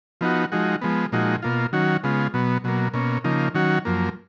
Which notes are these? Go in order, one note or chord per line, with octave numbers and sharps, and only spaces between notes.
F3 B3 D#4 F#4
F3 G#3 D#4 F#4
F3 G#3 B3
A#2 F3 G#3 D#4 F#4
B2 A#3 F4
D#3 F#3 C#4 F#4
C#3 G#3 B3 F4
B2 F#3 B3
B2 F#3 A#3
B2 A#3 C#4
C#3 F3 A#3 D#4
D#3 F#3 C#4 F#4
F#2 F3 A#3